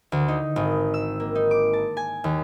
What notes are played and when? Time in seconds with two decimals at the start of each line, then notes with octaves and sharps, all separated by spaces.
0.12 D2
0.28 D#4
0.56 G#1
0.94 E6
1.20 A#3
1.35 D#4
1.51 D6
1.73 A5
1.97 G#5
2.24 D#2